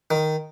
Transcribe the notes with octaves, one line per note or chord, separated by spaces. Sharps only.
D#3